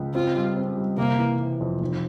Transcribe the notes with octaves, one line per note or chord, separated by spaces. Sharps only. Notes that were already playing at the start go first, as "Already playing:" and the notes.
Already playing: C#2
C4 F4
G3
C4
G3
C3 A#3
E3
E3
F2
F1